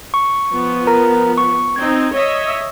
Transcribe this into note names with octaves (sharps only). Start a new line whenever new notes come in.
C#6
F3 B3
A#4 A#5
C#6
C4 D#4 G#6
C#5 D#5 E5